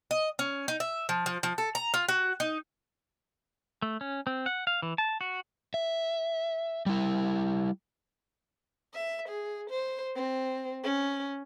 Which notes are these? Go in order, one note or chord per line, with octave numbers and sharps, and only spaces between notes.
D#5
C#4
D#4
E5
F3
F3
F3
A4
A#5
F4
F#4
D#4
A3
C#4
C4
F#5
F5
E3
A5
F#4
E5
G3 E4
E5
G#4
C5
C4
C#4